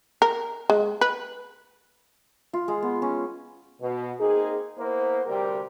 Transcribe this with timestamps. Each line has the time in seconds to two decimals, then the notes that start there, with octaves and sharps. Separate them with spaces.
0.22 A#4
0.70 G#3
1.01 B4
2.53 F4
2.68 G#3
2.82 B3
3.02 C#4
3.81 B2
4.19 A#3 C4 D#4 G#4
4.78 A#3 B3 E4 C5
5.26 D2 C3 G3 G4 A#4 G5